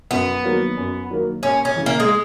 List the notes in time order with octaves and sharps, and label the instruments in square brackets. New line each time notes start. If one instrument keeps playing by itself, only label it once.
[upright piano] F#2 [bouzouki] B3
[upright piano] D#3 F#3 A#3
F#2
D#3 F#3 A#3
[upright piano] D#2 [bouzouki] C#4
[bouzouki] C#4
[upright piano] C#3 E3
[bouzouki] A#3
G#3